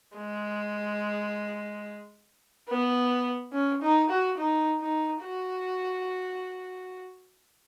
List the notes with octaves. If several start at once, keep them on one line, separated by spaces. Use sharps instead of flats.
G#3
B3
C#4
D#4
F#4
D#4
D#4
F#4